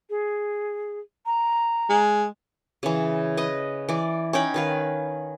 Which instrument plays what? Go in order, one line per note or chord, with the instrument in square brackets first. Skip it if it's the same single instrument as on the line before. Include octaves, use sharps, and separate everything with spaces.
[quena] G#4
A#5
[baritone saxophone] G#3
[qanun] C#3 E3
B4 D#5
E3 D5
C#4 D#4 G5 B5
D#3 B4 F5